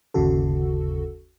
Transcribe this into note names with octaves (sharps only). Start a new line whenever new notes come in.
G1 D#2 C#3 F#4 A4